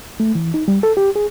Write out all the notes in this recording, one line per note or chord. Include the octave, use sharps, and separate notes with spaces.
A3
E3
D#4
G3
A4
G4
G#4